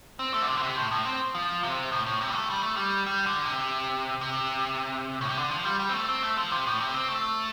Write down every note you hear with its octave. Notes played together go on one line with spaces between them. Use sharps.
C4
A3
D3
C3
D3
C3
A2
A2
C4
F3
C3
A2
A2
C3
G3
A3
G3
A3
G3
G3
D3
C3
C3
A2
C3
D3
F3
G3
G3
C4
A3
C4
A3
F3
C3
A2
C3
C4
A3